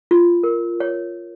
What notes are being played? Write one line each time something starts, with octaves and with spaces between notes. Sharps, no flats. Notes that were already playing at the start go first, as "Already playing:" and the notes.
F4
A#4
C#5